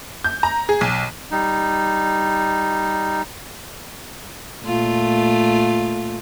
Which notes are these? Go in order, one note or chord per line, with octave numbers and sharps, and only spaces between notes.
G6
A#5
G#4
B1
G3 D#4
A#2 A3 F4